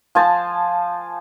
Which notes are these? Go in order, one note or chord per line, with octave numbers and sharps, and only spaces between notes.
F3 C5 G#5 A5